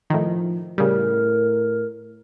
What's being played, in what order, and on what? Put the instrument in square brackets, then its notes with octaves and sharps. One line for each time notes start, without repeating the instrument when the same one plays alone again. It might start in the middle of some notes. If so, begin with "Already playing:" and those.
[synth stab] A2 D#3 [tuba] F3
[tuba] A2 [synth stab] C#3 G3 [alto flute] A#4